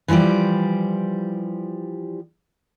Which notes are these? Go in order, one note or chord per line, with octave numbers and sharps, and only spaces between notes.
E3 F3 G3 G4 D5